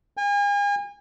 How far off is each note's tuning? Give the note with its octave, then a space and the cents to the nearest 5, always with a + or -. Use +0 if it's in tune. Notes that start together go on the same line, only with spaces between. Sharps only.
G#5 -40